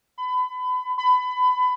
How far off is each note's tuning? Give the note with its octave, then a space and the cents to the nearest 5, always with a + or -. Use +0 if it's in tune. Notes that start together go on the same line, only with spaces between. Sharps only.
B5 +30
B5 +25